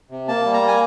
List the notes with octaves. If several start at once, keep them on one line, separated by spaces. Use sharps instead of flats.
C3
A#3 A5
G3
A#5
A#3
G#5